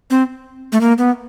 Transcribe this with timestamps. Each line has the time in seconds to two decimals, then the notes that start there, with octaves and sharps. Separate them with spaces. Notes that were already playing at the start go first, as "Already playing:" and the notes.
0.10 C4
0.72 A3
0.81 A#3
0.98 B3